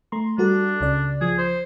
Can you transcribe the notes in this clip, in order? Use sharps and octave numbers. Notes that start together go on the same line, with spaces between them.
A3 A#5 C6
G3 D4 F#4 A4
C#2 C#3 D5
F3 G#4
C5